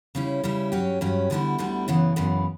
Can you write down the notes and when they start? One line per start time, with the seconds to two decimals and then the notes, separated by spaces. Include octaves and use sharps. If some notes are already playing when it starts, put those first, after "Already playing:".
0.15 C#3 G3 C#4 E4
0.44 C#3 G3 C#4 E4
0.72 G2 F#3 C#4 G4
1.01 G2 F#3 C#4 G4
1.30 D2 D3 G3 B3 E4
1.58 D2 D3 G3 B3 E4
1.88 F#2 C#3 E3 B3
2.16 F#2 C#3 E3 B3